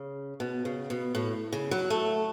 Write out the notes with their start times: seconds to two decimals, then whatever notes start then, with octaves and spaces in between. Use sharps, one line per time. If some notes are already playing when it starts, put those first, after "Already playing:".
Already playing: C#3
0.40 B2
0.65 C#3
0.90 B2
1.15 A2
1.52 C#3
1.71 F#3
1.90 A3